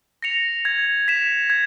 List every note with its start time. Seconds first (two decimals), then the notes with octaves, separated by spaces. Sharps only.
0.22 A#6 C#7 F7
0.65 G#6
1.08 B6 E7
1.50 G#6